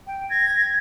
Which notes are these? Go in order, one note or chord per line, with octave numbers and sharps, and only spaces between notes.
G5
G#6 A#6